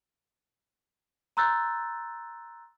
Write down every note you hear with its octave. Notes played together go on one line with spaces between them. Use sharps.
A#5 C6 E6 F#6 G6 A6